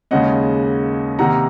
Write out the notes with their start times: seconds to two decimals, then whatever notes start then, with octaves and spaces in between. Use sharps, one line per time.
0.11 D#2 C#3 G#3 C#4 D#5 F#5
1.19 C3 D#3 A#3 D#4 F#5 A#5